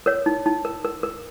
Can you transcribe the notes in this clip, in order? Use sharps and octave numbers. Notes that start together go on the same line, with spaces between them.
A#4 C#5
D#4
D#4
A#4
A#4
A#4